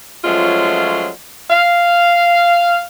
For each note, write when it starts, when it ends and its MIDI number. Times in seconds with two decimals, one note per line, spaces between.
0.24 1.09 53
0.24 1.09 54
0.24 1.09 56
0.24 1.09 57
0.24 1.09 61
0.24 1.09 65
1.50 2.81 77